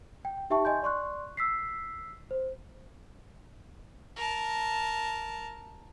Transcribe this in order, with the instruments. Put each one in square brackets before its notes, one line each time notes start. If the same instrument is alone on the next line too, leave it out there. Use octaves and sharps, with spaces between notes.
[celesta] G5
D#4 G4 E5 G5 A5 C#6
D#5 G#5 C6 G6
D5 C6 C#6 F#6
E6 B6 C7
C5
[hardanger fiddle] A#4 A5